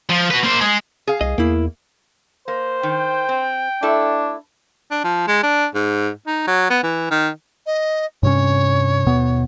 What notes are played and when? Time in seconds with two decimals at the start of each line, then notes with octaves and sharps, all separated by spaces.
0.10 F3
0.31 F#4 B4
0.44 A#3 C5
0.61 G#3 G#4
1.07 G#4 F5
1.21 C2 D#5
1.38 E2 A#3 E4
2.48 A#3 C5
2.83 D#3 G5
3.29 C4
3.82 A3 D4 E4 A4
4.91 D4
5.04 F3
5.28 G#3
5.43 D4
5.75 G#2
6.27 D#4
6.47 F#3
6.70 B3
6.83 E3
7.11 D#3
7.66 D#5
8.23 G2 C3 C#4 C#5
9.06 D#2 B2 B3